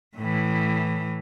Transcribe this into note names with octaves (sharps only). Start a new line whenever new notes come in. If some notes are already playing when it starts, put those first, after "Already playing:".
A2 E3